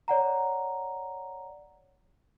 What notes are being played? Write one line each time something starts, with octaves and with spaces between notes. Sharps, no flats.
C#5 D5 F#5 A#5